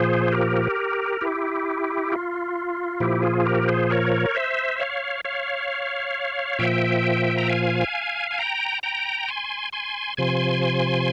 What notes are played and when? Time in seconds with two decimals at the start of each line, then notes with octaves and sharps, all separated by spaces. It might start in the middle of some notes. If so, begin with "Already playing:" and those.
Already playing: A#2 F3 G#4 C5
0.32 G4 A#4
1.21 E4 G4
2.12 F4
3.00 A#2 F3 E4 G4
3.23 F4 G#4
3.46 G4 A#4
3.68 G#4 C5
3.90 A#4 C#5
4.35 C5 E5
4.80 C#5 F5
5.25 C#5 F5
6.59 A#2 F3 E5 G5
7.37 A#5
7.49 F5 G#5
8.31 G#5
8.39 G5 A#5
8.83 G5 A#5
9.28 G#5 C6
9.73 G#5 C6
10.17 C3 F3 G#5 C6